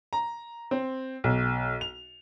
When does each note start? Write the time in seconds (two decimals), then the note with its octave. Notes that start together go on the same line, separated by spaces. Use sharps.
0.13 A#5
0.71 C4
1.24 B1
1.81 F7